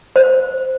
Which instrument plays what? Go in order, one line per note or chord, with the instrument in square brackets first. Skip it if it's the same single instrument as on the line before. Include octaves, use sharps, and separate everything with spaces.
[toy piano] C5